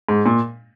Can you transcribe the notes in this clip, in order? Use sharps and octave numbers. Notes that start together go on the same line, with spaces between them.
G#2
A#2